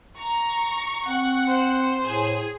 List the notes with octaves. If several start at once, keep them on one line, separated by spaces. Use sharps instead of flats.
A#5 C#6
C4 F#5
C5
A2 G#4